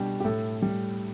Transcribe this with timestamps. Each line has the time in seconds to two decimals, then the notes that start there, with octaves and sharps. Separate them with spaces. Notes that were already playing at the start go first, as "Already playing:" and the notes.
Already playing: B2 G3 D4 G4
0.20 G4
0.25 A2 A4
0.62 G3